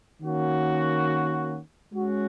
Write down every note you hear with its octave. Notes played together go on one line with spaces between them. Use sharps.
D#3 A#3 C#4 F#4
G#3 C#4 F#4